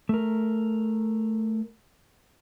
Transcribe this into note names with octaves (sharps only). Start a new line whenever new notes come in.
A3 A#4